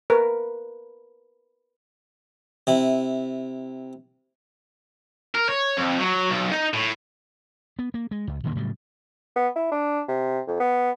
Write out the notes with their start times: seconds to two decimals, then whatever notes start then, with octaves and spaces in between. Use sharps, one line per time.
0.10 A#4 B4
2.67 C3 E4
5.35 A#4
5.49 C#5
5.77 F2
5.99 F#3
6.30 B1
6.52 D#4
6.73 A2
7.79 B3
7.94 A#3
8.11 G#3
8.27 C#2
8.44 D1 D2 D3 A#3
8.55 A2 C#3 F#3 G3
9.36 B3
9.56 E4
9.72 D4
10.08 C3
10.48 F2
10.60 B3